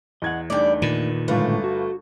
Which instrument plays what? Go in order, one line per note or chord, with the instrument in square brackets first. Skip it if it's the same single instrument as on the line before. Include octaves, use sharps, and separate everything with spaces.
[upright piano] E2 G#6 [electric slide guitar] D#5 F#5
[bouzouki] G3 D5 [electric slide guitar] A3 D4 D#4
[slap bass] A#2 D#3 [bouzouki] B4
[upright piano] G1 F4 B4 [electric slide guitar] A2 D3 G#3 [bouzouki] A3
[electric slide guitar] F#4